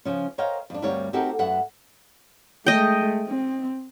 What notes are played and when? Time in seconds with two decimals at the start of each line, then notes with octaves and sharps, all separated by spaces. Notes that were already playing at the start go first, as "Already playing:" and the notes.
0.05 C#3 F3 C#4
0.38 A#4 C5 C#5 D#5 F5 G5
0.70 F2 D4
0.82 D2 G2 G3 C4 A#4 C#5
1.13 C4 D#4 F#4 G4 A4 A#4
1.39 F#2 B4 E5 F#5
2.66 G#3 A3 D#5 G5
3.28 C4